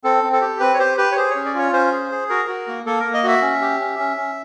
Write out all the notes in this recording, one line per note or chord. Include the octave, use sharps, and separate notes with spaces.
C4 A4
C4
A4
G4
C4 B4
C#5
G4 C5
G4 B4
C#5
G#4 C5
C#5
C#4
D5
F4 C#5
C#4 C5
G#4
G#4
F#4 A#4
F#4
A#3
A#3 A4
A#3 A#4
D#5
F#4 E5
C#4
G4
C#4
C#4
C#4